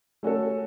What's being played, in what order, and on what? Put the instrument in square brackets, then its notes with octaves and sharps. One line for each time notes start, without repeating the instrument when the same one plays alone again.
[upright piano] A3 C#4 F#4 A4